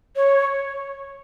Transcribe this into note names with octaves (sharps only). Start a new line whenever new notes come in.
C#5